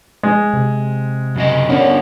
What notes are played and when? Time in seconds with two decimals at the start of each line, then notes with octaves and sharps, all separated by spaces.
0.23 G#3
0.54 C3
1.36 F#2 C#3 D#5
1.69 D3 B3 C#4 D4 A#4